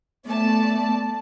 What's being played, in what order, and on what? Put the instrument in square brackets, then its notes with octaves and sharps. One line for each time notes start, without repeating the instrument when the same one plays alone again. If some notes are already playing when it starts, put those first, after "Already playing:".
[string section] A3 D5 A5 [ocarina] B3